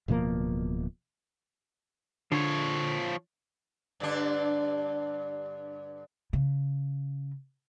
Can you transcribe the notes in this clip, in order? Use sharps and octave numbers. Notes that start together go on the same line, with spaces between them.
D1 B2 F3 A#3
D3 F3 C#5
G2 D3 D4
C#3